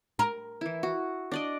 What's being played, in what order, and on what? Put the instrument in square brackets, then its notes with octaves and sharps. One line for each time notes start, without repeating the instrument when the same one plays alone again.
[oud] A#4
[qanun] E3 E4
F#4
D4 D5 D#5